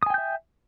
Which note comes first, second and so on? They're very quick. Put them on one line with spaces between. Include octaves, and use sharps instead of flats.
D#6 G#5 G5 G6 E5